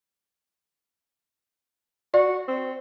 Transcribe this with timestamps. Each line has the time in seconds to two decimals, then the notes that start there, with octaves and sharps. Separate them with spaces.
2.14 F#4 D5
2.48 C4